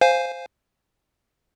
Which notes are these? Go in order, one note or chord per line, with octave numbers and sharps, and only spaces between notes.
C5 F5 G#5